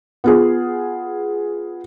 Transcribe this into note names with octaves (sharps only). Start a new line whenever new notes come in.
B3 F4 G#4